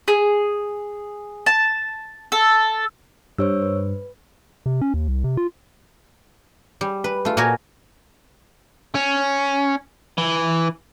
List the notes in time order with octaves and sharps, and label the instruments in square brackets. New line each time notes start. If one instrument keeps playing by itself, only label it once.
[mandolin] G#4
A5
A4
[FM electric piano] G2 [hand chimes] C5 C#5 E6
[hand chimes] B4
[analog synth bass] C3
C#4
D#2
C2
C3
F4
[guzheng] G3
B4
A3 F4
A#2 A#3 F#4 A#4 C#5 G#5
[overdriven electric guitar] C#4
E3